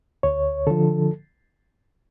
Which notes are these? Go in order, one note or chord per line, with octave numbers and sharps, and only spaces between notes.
D2 C#5
D3 F3 A4